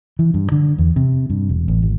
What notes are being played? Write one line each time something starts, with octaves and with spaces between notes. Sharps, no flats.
E3
G2
D3
E2
C3
G2
E1
A1
G#1